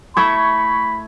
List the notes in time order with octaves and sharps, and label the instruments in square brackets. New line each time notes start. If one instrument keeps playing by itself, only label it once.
[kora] A3 E4 A4 [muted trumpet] B5 [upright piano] C#6 G#6